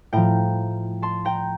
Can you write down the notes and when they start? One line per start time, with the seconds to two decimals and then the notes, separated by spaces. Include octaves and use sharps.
0.13 A2 F3 G5 A#5
1.02 A5 C6
1.25 G5 A#5